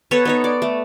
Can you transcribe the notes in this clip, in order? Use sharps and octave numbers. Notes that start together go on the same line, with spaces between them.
B3 A4 B4 C#5
B3 D#4 C#5
D5
A3